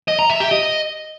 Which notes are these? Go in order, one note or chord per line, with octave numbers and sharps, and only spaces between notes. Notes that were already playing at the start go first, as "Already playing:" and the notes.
D#5
A#5
E5
G4
D#5